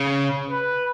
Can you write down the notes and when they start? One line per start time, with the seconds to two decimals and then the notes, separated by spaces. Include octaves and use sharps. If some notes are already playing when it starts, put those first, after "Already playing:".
Already playing: C#3
0.50 B4